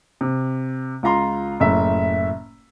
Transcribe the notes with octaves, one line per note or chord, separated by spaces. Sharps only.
C3
C#2 F4 A#5 C6
F#1 A2 E5